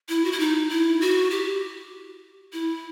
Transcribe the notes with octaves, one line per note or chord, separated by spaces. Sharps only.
E4
F#4
E4
D#4
E4
F#4
G4
E4